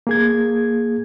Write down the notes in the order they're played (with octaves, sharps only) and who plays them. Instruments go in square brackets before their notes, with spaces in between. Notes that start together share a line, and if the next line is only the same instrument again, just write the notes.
[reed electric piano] A#3 G#4 G#6